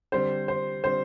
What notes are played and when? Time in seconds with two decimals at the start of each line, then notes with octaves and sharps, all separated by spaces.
0.12 D3 G3 C4 C5
0.48 C5
0.84 D3 G3 C4 C5